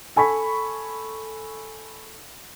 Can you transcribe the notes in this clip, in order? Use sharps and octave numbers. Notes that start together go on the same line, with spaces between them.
A4 G#5 B5 C#6 B6